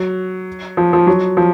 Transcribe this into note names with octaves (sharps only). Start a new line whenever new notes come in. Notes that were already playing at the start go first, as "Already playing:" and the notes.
Already playing: F#3
F3
F3
F#3
F3